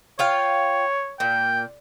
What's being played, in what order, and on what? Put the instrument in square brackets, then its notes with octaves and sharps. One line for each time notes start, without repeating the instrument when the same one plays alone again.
[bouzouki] F4 F5 G5 [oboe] C#5
[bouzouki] A#2 [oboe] G5